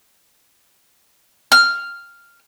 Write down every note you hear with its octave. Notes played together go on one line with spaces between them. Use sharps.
F6